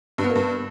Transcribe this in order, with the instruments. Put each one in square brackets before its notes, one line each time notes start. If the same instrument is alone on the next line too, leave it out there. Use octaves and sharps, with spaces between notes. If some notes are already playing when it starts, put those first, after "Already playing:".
[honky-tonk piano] G2
B3
A#3
G2